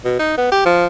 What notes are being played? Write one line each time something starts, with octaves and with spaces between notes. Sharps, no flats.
B2
D#4
B3
G4
F3